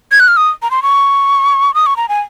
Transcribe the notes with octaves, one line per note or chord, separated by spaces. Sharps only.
G#6
F#6
F6
D#6
A#5
C6
C#6
D#6
C#6
A#5
G#5